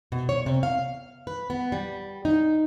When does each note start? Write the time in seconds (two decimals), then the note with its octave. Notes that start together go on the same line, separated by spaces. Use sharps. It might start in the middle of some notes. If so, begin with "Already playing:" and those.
0.12 B2
0.29 C#5
0.46 C3
0.63 F5
1.27 B4
1.50 B3
1.72 G3
2.25 D#4